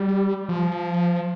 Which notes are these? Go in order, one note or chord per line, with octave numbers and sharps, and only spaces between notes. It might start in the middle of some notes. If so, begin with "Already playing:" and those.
Already playing: G3
F3